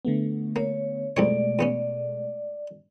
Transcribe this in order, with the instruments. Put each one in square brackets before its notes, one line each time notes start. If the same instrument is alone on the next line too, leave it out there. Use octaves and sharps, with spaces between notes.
[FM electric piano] D3 A3 B3
[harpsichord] A#3 [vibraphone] C#5
[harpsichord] C2 F2 C#5 [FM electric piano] B2 G#3 A3 [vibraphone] D5
[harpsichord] E2 B3 C#4